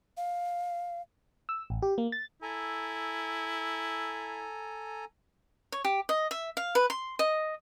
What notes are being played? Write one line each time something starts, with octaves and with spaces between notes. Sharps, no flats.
F5
E6
A1
G4
A#3
A6
E4 A4 G#5 A#5
C#5
G4
D#5
E5
F5
B4
C6
D#5